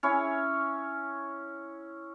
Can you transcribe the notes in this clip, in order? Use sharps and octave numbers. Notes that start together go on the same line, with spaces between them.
C#4 E4 C#5